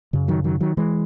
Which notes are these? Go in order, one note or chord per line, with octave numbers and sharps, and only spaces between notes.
F#2 C#3
D#3 F#3
D#3 F#3
D#3 F#3
E3 G#3